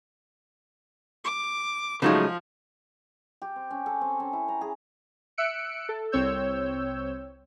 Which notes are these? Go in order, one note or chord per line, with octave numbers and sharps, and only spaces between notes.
D6
C#3 F3 F#3 G#3 A3 D#4 F#4
G4
C4
C#4
A4
C4
C#4
E4
A#5
G#4
E5 E6 F#6 C#7 D7
A4
C2 C4 C#5 E6 G6